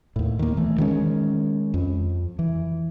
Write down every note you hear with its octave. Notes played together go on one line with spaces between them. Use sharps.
D#2 A2
D#3 A#3
E3 A3
D#3 G#3 C#4
F2
E3